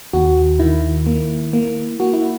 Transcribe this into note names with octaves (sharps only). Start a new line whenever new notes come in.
D#2 F#4
D#3 E4
A#3
A#3
A#3 F#4
E4